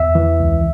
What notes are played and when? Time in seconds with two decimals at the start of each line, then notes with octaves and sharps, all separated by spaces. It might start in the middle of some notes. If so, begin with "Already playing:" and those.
Already playing: E2 E5
0.15 E3
0.40 C#2